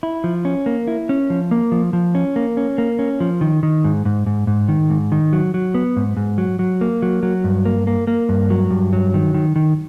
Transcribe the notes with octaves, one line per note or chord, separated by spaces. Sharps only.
E4
F3
C#4
A#3
E4
C#4
F3
A#3
F3
F3
C#4
A#3
C#4
A#3
C#4
F3
D#3
D#3
G#2
G#2
G#2
G#2
D#3
G#2
D#3
F#3
F#3
B3
G#2
G#2
F#3
F#3
A#3
F#3
F#3
G2
A#3
A#3
A#3
G2
F#3
G2
F#3
D#3
D#3
D#3